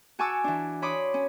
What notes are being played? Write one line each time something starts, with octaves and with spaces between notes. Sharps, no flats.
F#4 G#5 A5 C#6 D6 E6
E3 D4
C#5 B5 C6 D6 D#6
C#4